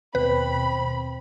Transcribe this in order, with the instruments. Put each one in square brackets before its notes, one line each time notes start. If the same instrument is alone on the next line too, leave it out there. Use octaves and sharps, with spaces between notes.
[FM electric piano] D#2 B2 [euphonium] C4 [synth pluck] B4 [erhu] B5